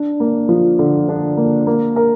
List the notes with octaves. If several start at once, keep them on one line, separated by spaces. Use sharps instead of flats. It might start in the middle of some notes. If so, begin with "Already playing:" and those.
Already playing: D4
A#3
F3
D3
D4
A#3
A#3
A#4